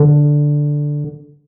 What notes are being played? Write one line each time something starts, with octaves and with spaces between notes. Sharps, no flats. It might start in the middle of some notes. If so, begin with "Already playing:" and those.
Already playing: D3